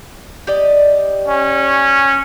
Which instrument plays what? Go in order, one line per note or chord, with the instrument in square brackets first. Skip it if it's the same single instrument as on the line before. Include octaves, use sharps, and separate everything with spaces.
[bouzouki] G4 D5 D#5
[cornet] C#4